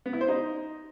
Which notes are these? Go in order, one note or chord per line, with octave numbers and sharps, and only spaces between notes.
B3
E4
C5
D#4